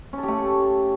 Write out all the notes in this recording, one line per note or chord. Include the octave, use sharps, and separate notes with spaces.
C#4
A4
G4
A3